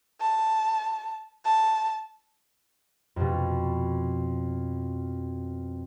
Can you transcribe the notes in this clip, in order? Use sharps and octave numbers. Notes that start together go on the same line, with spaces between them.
A5
A5
F2 B2